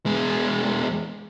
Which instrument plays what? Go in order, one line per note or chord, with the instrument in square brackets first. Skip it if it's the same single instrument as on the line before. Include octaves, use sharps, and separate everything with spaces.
[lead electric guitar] E2 G#3